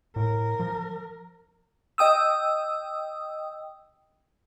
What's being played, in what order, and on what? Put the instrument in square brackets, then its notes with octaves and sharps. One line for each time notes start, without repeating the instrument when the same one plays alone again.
[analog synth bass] A2 [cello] A#4
[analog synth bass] F3
[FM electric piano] D#5 G5 D#6 E6